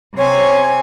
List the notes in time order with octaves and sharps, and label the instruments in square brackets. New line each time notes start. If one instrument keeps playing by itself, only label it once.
[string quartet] C3 C4 G#5 [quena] C#5